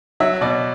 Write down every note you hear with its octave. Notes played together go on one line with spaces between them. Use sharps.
F#3 E5
B2 D5